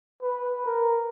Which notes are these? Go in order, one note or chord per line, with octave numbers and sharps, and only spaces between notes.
B4
A#4